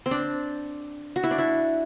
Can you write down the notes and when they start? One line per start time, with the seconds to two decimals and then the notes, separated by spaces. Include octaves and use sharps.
0.06 C4
0.11 D4
1.16 F#4
1.24 E4
1.31 D4
1.38 E4